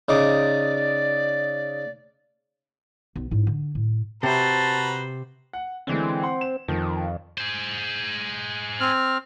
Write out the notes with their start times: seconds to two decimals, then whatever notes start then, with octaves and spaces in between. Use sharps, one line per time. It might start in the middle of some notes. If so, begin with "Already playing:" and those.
0.09 C#3 D#4 D5 D6
3.16 B1
3.31 G#2 E4
3.47 D3
3.75 A2
4.23 C3 F#4 B4 C5 A5 A#5
5.53 F#5
5.87 D3 E3 G#3 C4
6.23 F#5 C6
6.41 E7
6.68 F2 D#3 F3
7.38 G#4 C5
8.80 C4 F6